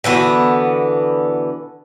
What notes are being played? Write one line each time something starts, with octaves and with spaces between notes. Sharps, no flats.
D3 E3 B3 F#4